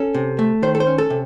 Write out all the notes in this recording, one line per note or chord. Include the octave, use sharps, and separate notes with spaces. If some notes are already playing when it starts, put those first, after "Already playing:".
Already playing: C#4 A4
C3
A3
D#3 C5
A4
C5
C#4
A4
C3